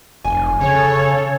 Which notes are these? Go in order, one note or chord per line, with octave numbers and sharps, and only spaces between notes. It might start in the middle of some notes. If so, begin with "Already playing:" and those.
F1 G#5
C#3 A4 C#5